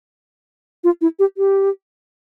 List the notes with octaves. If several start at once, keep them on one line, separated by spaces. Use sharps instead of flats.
F4
E4
G4
G4